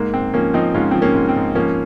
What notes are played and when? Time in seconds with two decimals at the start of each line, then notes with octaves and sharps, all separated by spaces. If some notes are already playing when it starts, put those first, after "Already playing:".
Already playing: G#2 A#3
0.13 G#2 C4
0.34 F3 A#3 C#4
0.54 F3 C4 D#4
0.74 G#2 C#4 F4
0.91 F3 C4
1.02 A#3 C#4
1.15 G#2
1.29 C4
1.36 G#2
1.55 F3 A#3 C#4